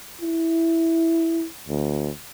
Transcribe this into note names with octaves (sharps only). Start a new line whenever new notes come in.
E4
D2